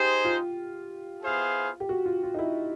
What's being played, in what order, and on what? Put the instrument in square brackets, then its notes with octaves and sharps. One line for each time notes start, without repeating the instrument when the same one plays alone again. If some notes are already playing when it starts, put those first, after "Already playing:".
Already playing: [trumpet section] D#4 G#4 C5 [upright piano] G4
[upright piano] F4
[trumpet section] B3 E4 G#4 C5 F5
[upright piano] G4
F#4
F4
F4
D#4
E4